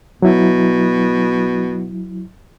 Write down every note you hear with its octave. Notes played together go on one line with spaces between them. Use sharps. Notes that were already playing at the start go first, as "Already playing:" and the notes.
B2 F#3 E4